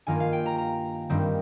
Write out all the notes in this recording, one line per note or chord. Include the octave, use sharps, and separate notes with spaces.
G2 D#3 A#3 F4 G#5
F5
G5
A#5
A#5
G2 D#3 G3 C4